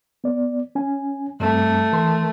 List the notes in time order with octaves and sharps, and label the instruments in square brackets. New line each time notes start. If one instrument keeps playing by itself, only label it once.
[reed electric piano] B3 D5
C#4 G#5
[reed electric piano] G2 G3 C4 [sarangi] A3
[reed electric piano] E3 A#4 C6